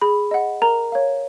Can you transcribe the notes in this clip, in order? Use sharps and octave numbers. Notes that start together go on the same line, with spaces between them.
G#4 B5
D#5 F#5
A#4 A#5
C#5 F5